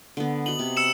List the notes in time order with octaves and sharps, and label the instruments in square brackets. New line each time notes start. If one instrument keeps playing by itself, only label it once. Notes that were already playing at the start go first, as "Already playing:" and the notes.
[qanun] D3 B3
[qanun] F#4 D#5 [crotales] F#7
[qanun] C3 B3
[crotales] E6 C#7 E7